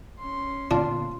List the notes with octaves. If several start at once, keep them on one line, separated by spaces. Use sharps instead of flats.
C#4 C6
A#2 D3 B3 D4 F4